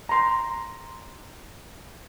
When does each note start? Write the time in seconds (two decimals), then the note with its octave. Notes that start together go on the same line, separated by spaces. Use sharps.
0.09 A#5 C6